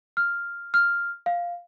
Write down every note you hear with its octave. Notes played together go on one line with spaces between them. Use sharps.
F6
F6
F5